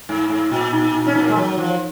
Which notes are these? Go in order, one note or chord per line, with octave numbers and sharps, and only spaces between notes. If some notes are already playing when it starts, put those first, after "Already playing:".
G#2
G#2
A#2
D#4
D#4
C#4
B3 D#4
A#3
G#3
F#3
F3